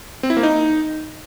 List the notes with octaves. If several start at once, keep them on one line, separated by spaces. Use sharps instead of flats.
C4
E4
A#3
D#4